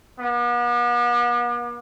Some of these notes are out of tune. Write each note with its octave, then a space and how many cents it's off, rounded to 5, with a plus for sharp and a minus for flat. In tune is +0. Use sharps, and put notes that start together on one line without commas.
B3 -45